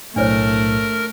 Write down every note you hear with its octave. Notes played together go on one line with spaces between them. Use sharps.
B1 A2 A3 D4 A#4 C5 C#5